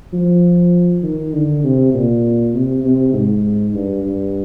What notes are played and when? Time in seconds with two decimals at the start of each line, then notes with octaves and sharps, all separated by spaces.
0.13 F3
1.03 D#3
1.33 D3
1.64 C3
1.94 A#2
2.54 C3
2.83 C3
3.13 G#2
3.74 G2
4.04 G2